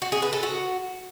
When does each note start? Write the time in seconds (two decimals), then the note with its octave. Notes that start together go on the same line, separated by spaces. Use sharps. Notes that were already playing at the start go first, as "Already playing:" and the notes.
0.02 F#4
0.12 G#4
0.22 B4
0.33 A4
0.43 F#4